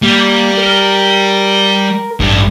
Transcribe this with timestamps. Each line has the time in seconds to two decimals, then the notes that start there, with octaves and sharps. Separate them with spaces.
0.02 G3 A#3
0.57 A#4
2.20 A1 G2